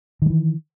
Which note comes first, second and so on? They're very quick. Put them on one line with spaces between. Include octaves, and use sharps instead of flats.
D#3 G3 E3